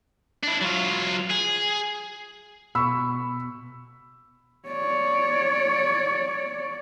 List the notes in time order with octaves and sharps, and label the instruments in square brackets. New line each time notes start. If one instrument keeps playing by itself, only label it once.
[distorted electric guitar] D4 E4
F#3 F4
G#4
[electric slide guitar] B2 [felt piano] B5 C#6 [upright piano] E6
[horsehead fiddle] C#5 D5